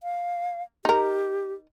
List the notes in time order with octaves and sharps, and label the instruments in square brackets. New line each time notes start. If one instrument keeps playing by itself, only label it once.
[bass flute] F5
[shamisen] D#4 A#4 [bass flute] G4